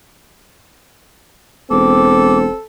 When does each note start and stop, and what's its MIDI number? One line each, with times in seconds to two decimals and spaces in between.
1.71 2.47 28
1.71 2.55 60
1.71 2.65 69
1.71 2.38 86